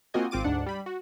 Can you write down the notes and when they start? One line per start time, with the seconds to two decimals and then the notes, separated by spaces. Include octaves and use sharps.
0.14 A#3 C4 F4 F#4 D#5 G#5
0.31 G#1 C4 F4 D6 D#7
0.44 D2 G#2 D4 F#5
0.66 G3 B5
0.86 F#4